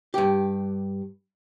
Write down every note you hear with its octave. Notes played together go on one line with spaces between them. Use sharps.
G2 G4